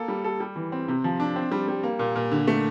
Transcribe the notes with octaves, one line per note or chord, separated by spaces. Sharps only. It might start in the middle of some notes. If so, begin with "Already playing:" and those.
Already playing: A#3 A4
G3
A4
G3
E3
C4
C3
F3
D4
C4
G3
G3
A#3
A#2
A#2
D3
A3